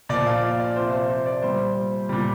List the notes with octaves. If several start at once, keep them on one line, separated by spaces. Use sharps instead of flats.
A#2 F3 D5
F5
D5
D5
C3 F3 C5
C5
C5
D5
A#2 G3 C5
A#2 G3